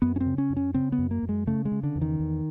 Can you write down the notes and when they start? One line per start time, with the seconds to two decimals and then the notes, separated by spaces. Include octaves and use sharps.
0.02 F#2 B3
0.16 C#4
0.20 C4
0.26 C#3
0.38 C#4
0.50 F#2
0.57 C#4
0.74 C#3 C4
0.92 B3
0.98 F#2
1.11 A#3
1.23 F#2
1.29 G#3
1.47 C#3 A3
1.65 G#3
1.72 C#3
1.83 D3
1.96 E2
2.02 D#3
2.20 E2